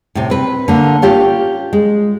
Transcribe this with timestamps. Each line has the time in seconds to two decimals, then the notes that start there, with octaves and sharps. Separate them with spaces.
0.15 A2 C3
0.30 C4 B4
0.68 D3 A#3
1.02 C#4 F4 G4
1.73 G#3